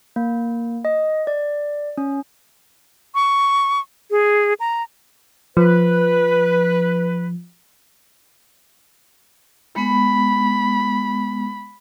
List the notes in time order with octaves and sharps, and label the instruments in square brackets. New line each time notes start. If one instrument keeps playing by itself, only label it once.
[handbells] A#3
D#5
D5
C#4
[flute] C#6
G#4
A#5
[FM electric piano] F3 [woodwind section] B4
[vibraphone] G#3 B3 [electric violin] B5